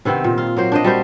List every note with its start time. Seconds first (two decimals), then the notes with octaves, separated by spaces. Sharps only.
0.05 C3 D#3 B3 C4
0.24 A#2
0.38 F4
0.56 F#3 A#3 C5
0.72 D4 C5 D#5
0.84 G3 F#4 C5